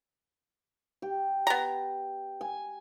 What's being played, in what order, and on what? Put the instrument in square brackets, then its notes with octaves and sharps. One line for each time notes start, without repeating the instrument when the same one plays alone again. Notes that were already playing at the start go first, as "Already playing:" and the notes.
[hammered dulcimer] G4
[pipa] B3 A#5
[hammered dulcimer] G#5